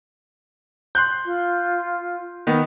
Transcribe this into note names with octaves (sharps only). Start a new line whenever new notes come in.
C6 F#6 G6
F4
D#3 B3